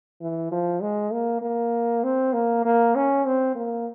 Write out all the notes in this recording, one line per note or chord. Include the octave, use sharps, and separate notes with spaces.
E3
F3
G#3
A#3
A#3
C4
A#3
A#3
C#4
C4
A#3